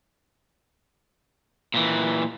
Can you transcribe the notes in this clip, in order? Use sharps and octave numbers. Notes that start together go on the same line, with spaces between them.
A#2 E3